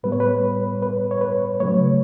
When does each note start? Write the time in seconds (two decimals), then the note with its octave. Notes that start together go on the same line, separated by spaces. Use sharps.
0.03 A2 G3 B3 B4
0.12 C#5
0.20 B4
0.82 B4
1.11 C#5
1.21 B4
1.60 C#3 F#3 A3 C#5